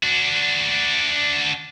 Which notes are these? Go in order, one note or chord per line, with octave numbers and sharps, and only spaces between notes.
D4 F#4